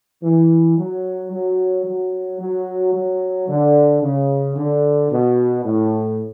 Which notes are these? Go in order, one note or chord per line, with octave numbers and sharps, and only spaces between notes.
E3
F#3
F#3
F#3
F#3
F#3
D3
C#3
D3
B2
A2